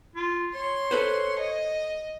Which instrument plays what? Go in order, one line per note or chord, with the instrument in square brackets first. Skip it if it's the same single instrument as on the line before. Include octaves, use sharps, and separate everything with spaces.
[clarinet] F4
[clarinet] C#5 [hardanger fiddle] C6
[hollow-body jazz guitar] A4 B4 C5
[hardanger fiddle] D#5